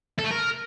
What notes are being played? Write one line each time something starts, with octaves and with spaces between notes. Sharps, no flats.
A4
A3
A#4